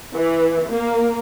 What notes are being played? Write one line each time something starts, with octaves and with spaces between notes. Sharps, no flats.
E3
A#3